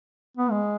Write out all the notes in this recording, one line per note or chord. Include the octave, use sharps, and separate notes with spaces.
B3
G#3